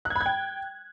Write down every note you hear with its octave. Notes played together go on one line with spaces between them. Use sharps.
F#6
G#6
B5
G#6
G5